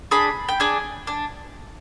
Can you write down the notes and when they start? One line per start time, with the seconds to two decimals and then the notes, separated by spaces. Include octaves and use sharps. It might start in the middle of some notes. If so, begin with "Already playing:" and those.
0.11 D4 G#4 B5
0.48 G5
0.60 D4 G#4 G#5
1.07 D4